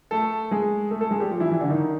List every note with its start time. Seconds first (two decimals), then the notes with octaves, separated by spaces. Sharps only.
0.11 A3 A4
0.51 G#3 G#4
0.91 A3 A4
1.01 A3 A4
1.11 G#3 G#4
1.20 G3 G4
1.30 F3 F4
1.40 E3 E4
1.51 E3 E4
1.60 D3 D4
1.70 D#3 D#4